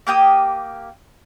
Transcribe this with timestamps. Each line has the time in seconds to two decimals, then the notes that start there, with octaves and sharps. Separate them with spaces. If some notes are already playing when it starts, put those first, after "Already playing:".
0.07 A#3 G4 G5 D#6